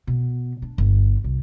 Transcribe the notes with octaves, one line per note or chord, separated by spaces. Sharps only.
B2
D4
G1
C2